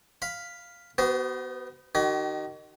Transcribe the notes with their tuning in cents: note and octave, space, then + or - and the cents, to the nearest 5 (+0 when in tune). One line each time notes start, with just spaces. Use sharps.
F5 +0 B5 +0
B3 +0 F#4 +40 C5 -40
D#3 -20 F#4 +45